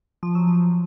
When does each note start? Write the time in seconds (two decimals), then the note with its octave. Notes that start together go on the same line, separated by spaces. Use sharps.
0.23 F3
0.35 F#3
0.47 F3